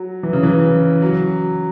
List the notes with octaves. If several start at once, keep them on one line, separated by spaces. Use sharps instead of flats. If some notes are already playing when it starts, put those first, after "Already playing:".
Already playing: F#3
E3
C#3
E3
F#3